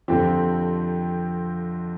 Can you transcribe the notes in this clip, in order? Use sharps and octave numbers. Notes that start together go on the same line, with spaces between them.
F2 D3 F3 C4 G4